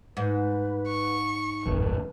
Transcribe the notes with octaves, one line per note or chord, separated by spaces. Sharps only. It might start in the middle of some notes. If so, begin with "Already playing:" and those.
G#2 B4
C#6
D1 G#1 F2 B4